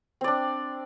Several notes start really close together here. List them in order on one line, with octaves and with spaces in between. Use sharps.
C4 D5 D4